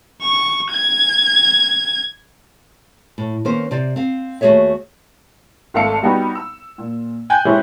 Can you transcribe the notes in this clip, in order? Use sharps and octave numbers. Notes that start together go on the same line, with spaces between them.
C#6
G#6
A2
D#3 A#3 B3 C#4 C5
C3 C5 D5
C4 F5
D#2 A3 F#4 G#4 C#5 E5
G#1 A3 A4 F5 E6 C#7
G3 B3 D#4 F#4 G4
E6
A#2
G5 G#5 F#6 G6
E3 G#3 C#4 E4 G4 C5